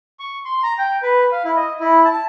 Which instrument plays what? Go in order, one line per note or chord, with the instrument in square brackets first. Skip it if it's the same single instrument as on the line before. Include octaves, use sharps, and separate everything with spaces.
[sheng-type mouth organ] C#6
C6
A#5
G5
B4
F5
E4
D#5
E4
A5